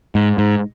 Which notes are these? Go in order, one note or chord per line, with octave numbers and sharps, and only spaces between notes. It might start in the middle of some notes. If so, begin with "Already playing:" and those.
G#2
G#2